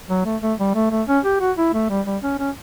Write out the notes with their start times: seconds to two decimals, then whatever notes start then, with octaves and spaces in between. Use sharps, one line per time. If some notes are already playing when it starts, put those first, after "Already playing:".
0.09 F#3
0.25 A3
0.42 A3
0.59 G3
0.75 A3
0.91 A3
1.08 C#4
1.24 G4
1.40 F#4
1.57 E4
1.74 A3
1.90 G3
2.06 G3
2.23 C#4
2.39 C#4